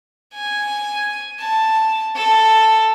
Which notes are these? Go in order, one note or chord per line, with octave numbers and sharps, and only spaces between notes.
G#5
A5
A4